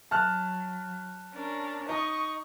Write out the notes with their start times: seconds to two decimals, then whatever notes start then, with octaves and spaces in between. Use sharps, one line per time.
0.11 F#3 A5 F6 F#6
1.34 C#4 D4 A#4
1.89 D#4 C#6 D#6